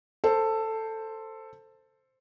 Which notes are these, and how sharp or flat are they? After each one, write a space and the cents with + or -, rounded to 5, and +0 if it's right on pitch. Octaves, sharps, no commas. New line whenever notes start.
A4 +10 C5 +0